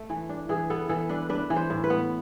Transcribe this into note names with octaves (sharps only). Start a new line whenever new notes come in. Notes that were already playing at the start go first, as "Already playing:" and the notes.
Already playing: A3
E3
D4
E3 G#4
B3 A4
E3 A4
D4 B4
D4 B4
E3
C5
A2
B4
B3